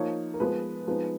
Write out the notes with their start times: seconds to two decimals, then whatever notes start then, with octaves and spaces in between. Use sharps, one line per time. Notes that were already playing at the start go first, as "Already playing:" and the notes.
Already playing: F3 A#3 D#4 C#5
0.34 A#4
0.40 F3 G#3 B3 B4
0.87 F3 G#3 B3 D#4